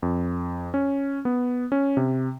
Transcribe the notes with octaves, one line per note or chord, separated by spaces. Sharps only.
F2
C#4
B3
C#4
C3